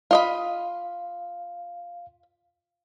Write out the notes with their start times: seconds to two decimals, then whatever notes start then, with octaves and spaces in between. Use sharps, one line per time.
0.11 F4 D#5 F5 B5